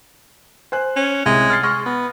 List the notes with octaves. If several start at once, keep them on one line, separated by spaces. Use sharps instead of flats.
C5 G#5 F#6
C#4
C2 G#3
F6 A6 C7
G#3 C#6 F6 A#6
B3